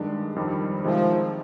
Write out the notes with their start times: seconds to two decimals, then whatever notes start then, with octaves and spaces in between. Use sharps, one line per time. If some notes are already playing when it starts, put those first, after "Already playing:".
Already playing: G2 D#3 G#3 D4
0.36 F2 D#3 G3 D4
0.84 C3 D#3 F3 G#3